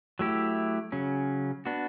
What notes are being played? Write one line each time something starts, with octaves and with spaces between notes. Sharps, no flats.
F#3 A3 E4 G4
C#3 F#3 C#4
B3 D4 F#4